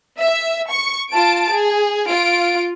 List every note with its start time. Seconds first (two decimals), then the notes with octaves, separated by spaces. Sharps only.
0.19 E5
0.71 C#6
1.12 F4 A5 D7
1.51 G#4
2.07 F4 D7